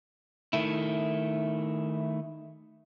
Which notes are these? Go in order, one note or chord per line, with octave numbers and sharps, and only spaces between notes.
D#3 A3 E4